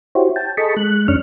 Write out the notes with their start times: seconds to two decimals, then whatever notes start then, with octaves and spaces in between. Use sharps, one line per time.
0.15 E4 F#4 G4 C5 C#5
0.36 G5 A5
0.57 G#4 A4 D#5 A5 B5 C#6
0.77 G#3 F#6
1.08 F#2 C#4 D4 C#6 F6